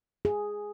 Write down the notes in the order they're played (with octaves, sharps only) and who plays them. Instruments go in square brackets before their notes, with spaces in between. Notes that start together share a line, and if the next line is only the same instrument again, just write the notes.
[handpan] G#4